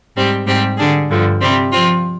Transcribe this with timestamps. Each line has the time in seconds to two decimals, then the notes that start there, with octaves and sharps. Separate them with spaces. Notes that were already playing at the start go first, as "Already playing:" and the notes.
0.16 G#2 G3 C4 G4
0.46 G#2 G3 C4 G4
0.77 D3 G3 D4 G#4
1.09 G2 D3 F3
1.41 C3 G3 C4
1.72 F3 C4 F4